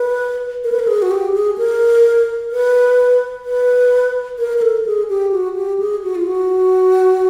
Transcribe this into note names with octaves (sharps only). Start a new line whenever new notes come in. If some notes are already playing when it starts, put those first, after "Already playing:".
Already playing: B4
A#4
B4
A#4
G#4
F#4
G4
G#4
A#4
B4
B4
A#4
A#4
A4
G#4
G4
F#4
G4
G#4
F#4
F4
F#4